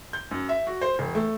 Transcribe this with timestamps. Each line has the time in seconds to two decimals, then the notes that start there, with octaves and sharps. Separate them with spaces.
0.13 G6
0.31 F#2
0.49 E5
0.67 F#4
0.81 C5
0.99 E1
1.15 A3